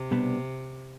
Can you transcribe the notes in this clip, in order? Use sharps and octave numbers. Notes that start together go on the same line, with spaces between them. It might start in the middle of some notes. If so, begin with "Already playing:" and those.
Already playing: C3
B2 G3 B3 D4